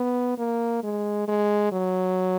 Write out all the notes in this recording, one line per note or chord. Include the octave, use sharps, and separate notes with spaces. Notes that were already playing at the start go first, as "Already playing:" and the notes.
Already playing: B3
A#3
G#3
G#3
F#3